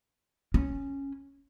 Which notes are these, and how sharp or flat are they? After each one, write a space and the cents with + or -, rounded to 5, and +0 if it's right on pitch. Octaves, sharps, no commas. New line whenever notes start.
C#4 -5